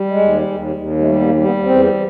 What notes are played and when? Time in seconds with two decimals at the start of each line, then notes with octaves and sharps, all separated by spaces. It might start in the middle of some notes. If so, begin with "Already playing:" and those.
Already playing: G3
0.08 G#3
0.17 D#2
0.47 D#2
0.76 D#2
0.99 G#3
1.05 G3 A3
1.20 B3
1.25 A#3
1.35 G3
1.44 B3
1.64 E2 C4